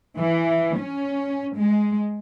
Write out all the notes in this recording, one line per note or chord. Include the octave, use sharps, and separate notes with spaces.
E3
C#4
G#3